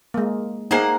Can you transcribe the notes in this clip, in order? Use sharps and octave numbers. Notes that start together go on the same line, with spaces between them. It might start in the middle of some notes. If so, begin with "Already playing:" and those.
G#3 A#3
A#3 D#4 G#4 C5 F#5